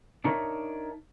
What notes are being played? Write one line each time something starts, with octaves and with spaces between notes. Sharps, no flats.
D4 D#4 A#4 C#5 E5